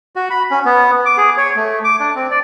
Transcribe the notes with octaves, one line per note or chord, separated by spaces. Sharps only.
F#4
B5
C#4
B3
D6
G#4
C#5
A3
D6
D4
C4
D5